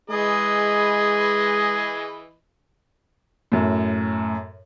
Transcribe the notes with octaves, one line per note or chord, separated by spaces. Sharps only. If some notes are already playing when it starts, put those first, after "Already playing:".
E3 G#3 G#4 B4 D#5
F#2 A2